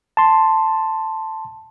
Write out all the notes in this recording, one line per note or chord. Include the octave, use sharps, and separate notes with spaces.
A5 C6